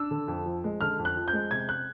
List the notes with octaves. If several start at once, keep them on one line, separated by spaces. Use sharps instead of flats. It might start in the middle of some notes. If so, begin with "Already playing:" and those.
Already playing: D4 E6
D3
F2
F3
G#3
D3 F6
F2
F#6
F3
G6
G#3
C3 G#6
F#6